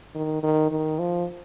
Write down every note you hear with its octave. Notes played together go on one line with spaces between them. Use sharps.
D#3
D#3
D#3
F3